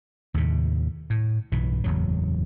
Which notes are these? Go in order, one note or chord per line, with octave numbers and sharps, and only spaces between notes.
D#2 A2 C3
A2
B1 G2 E3
F#1 E2 A2 F#3